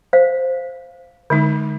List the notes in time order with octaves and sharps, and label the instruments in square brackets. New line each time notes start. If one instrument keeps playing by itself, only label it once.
[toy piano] C5 F5
[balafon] D3 G#3 D#4